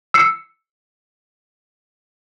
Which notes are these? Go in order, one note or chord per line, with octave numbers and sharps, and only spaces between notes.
E6 C7 C#7